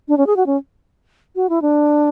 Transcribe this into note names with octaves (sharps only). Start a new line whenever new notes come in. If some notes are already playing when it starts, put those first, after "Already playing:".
D4
C#4
G#4
F#4
C#4
F#4
E4
D4